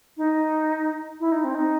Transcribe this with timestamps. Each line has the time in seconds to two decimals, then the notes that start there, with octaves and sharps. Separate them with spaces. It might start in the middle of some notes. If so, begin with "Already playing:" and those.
0.17 D#4
1.20 E4
1.32 D#4
1.44 C4
1.55 D#4